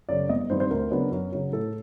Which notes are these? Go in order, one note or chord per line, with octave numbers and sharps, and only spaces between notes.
F#2 C#3 D5
G1 D#5
G2 D#3 G3 C4 C5
C5
D2 A#4
C#3 F#3 B3 D4
F#2
C#3 F#3
A2 A4